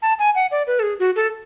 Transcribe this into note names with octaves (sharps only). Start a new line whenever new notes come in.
A5
G#5
F#5
D5
B4
A4
G#4
F#4
A4